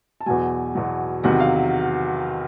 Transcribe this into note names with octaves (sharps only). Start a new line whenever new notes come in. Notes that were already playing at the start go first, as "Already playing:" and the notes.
A5
E2 B2 F#3 G#5
E2 B2 F#3
E2 C3 D#3 F#3 F#5
F5